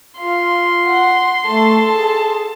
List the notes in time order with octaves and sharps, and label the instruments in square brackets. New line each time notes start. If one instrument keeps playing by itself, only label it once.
[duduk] F4 [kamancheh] F5 [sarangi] C6
[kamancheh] F#5
[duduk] A3 [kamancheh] A4 A5
[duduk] G#4